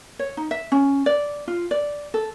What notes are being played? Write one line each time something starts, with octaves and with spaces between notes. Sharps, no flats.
C#5
D#4
E5
C#4
D5
F4
D5
A4